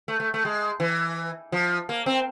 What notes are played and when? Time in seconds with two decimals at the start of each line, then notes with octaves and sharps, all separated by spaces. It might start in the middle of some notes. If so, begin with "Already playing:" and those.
0.08 A3
0.20 A3
0.34 A3
0.45 G#3
0.80 E3
1.52 F3
1.89 A#3
2.06 C4